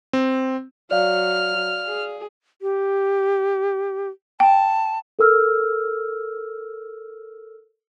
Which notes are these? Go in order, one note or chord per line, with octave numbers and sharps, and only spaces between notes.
C4
F#3 D5 F5 F6
G#4
G4
G5 A5
A4 A#4 E6 F6